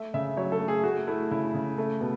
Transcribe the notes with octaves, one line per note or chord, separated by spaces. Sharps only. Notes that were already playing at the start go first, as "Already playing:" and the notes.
Already playing: A3 E5
C#3 E5
F#3 C#5
A4
A3
G#4
A3 F#4
A3 E4
C#3 E4
C#3
A3
B2